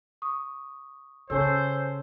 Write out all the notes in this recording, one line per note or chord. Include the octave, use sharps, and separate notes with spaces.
C#6 D#6
C#3 C#4 G#4 A4 C5 C#5 G#5 E6